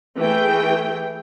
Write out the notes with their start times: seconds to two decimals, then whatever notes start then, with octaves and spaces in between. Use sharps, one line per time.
0.19 E3 A3 G#4 G5